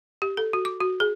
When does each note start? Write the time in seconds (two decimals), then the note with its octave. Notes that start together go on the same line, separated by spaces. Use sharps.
0.22 G4
0.37 A4
0.53 F#4
0.65 D6
0.80 F#4
1.00 G#4